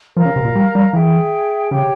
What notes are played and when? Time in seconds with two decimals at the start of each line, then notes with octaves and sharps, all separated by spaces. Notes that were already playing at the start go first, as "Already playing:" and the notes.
0.16 F3 A#4 F5 A#5
0.25 C#3
0.36 C3
0.45 A#2
0.55 G3
0.75 G3
0.93 E3 G#4 E5 G5
1.71 C#3 G4 C#5 G5